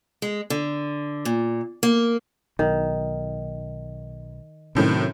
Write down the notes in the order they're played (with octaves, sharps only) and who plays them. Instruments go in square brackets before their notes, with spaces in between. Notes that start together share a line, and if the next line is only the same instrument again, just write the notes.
[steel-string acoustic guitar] G#3
D3
A#2
A#3
[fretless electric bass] B1 [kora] D#3
[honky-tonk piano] F#2 A2 D#3 [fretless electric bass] C3 F#3 C4